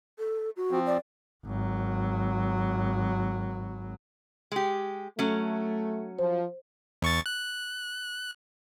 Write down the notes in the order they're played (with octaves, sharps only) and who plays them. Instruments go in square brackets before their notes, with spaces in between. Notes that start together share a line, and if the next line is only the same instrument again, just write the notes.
[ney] A4
F#4
[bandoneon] F3 C4
[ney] D5
[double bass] G#1 F#3
[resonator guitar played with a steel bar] G#3 G4
[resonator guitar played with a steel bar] F#3 C#4 [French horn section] A3
[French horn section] F3 [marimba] C5
[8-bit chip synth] E2 C#6 A6
F#6